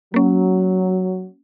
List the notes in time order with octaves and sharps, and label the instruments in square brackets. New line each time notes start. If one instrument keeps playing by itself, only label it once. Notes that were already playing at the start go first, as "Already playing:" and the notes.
[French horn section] F#3 [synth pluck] A#3 C#4